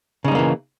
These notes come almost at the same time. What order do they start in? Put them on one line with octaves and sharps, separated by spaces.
C#3 D#4 G3 A#3 E3